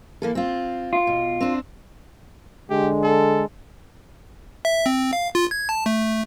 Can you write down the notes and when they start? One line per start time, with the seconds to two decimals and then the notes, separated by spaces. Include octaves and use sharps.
0.22 E3 A#3 A4
0.35 C4 F4
0.93 F4
1.07 B2
1.41 C4 D4
2.70 D3 G#3 G4
3.03 A4
4.65 E5
4.86 C4
5.13 F5
5.35 F4
5.51 G#6
5.69 A5
5.86 A3